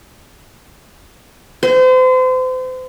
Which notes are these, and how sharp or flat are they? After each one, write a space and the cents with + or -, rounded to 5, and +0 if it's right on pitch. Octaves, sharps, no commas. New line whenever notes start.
C5 -35